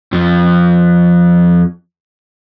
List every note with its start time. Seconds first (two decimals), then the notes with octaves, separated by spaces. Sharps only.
0.13 F2 F3